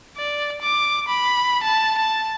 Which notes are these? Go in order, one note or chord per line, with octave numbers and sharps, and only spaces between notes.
D5
D6
B5
A5
A5